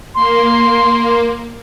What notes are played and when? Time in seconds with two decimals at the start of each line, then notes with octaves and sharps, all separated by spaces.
0.15 A#3 C6